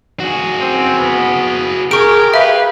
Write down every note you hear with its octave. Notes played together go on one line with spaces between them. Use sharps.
F#4 G#4
C4
B3
G4 G#4 A#4 C#6 D7
B4 E5 F5